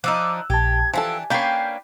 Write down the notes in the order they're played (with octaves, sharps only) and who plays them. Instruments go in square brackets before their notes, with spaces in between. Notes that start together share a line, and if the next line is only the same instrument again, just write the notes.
[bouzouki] F3 D4 D#4 [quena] D6 [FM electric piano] E6 F#6
[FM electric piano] A#1 A5 [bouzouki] G4 [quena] G#6
[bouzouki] E3 D4 [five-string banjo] F3 A4 [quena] G5 [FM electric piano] G#5
[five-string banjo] A#3 C#4 [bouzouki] D4 B4 G5 [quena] F5 [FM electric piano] G6 C7